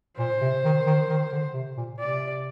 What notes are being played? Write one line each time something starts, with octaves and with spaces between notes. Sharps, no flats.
A#2 C5
C3
D#3
D#3
D#3
D3
C3
A#2
C3 D5